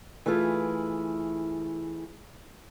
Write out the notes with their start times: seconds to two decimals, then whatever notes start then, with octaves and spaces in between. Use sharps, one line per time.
0.26 E3 A3 E4 F4 G#4